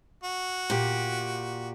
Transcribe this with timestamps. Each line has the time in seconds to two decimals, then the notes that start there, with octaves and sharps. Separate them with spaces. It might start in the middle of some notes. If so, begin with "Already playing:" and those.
0.23 F#4
0.70 A#2 G4